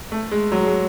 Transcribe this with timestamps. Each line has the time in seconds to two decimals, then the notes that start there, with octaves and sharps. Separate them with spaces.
0.12 A3
0.32 G#3
0.52 F#3
0.66 G#3